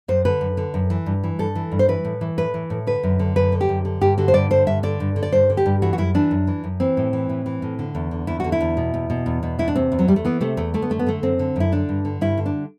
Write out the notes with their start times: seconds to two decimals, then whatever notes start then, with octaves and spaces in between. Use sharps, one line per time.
0.08 F#2 C5
0.25 D3 B4
0.41 F#2
0.57 D3
0.74 F#2
0.90 E3
1.06 G2
1.24 E3
1.39 G2 A4
1.55 E3
1.72 G2
1.79 C5
1.88 E3 B4
2.05 A2
2.21 E3
2.38 A2 B4
2.54 E3
2.70 A2
2.87 D3 B4
3.03 F#2
3.19 D3
3.36 F#2 B4
3.52 D3
3.61 G4
3.69 F#2
3.85 D3
4.01 G2 G4
4.18 D3 F#4
4.28 C5
4.34 G2 D5
4.50 D3 C5
4.67 G2 E5
4.83 D3 D5
5.00 G2
5.16 D3
5.23 D5
5.32 G2 C5
5.50 D3
5.57 G4
5.66 G2
5.82 E3 F#4
5.93 F#4
5.98 F#2 E4
6.14 E3 D4
6.31 F#2
6.47 E3
6.64 F#2
6.80 E3 C4
6.97 A2
7.13 E3
7.29 A2
7.46 E3
7.62 A2
7.79 D3
7.95 E2
8.11 D3
8.27 E2 E4
8.40 D3 F#4
8.52 E4
8.61 E2
8.77 B2
8.94 E2
9.10 B2
9.26 E2
9.43 B2
9.59 E2 E4
9.68 D4
9.76 C3 C4
9.92 E2
9.99 F#3
10.08 E2 G3
10.16 A3
10.25 E3 B3
10.41 C3 A3
10.57 E2 A3
10.74 D3 A3
10.82 B3
10.90 F#2 A3
10.99 B3
11.06 D3 A3
11.23 F#2 C4
11.39 D3
11.56 F#2 E4
11.72 D3 D4
11.89 G2
12.05 D3
12.21 G2 E4
12.38 D3
12.46 D4